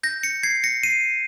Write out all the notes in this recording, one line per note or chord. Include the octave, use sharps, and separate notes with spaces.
G6 A#6
A#6 C#7
G#6 C7
A#6 C#7
C7 D#7